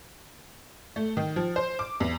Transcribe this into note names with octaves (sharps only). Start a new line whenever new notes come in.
A3
D#3
F3
C5
D6
E2